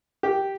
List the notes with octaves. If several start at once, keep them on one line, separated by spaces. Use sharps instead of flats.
G4